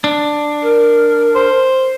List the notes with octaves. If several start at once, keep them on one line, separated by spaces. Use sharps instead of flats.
D4
A#4
C5